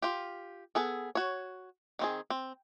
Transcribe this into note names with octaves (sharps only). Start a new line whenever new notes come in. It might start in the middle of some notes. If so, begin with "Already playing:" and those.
F4 G4
B3 G#4 A4
F#4 C#5
D#3 C4 G#4
C4